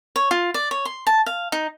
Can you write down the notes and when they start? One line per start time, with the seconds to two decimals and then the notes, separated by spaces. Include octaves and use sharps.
0.16 C#5
0.31 F4
0.54 D5
0.71 C#5
0.85 C6
1.07 A5
1.26 F5
1.52 D#4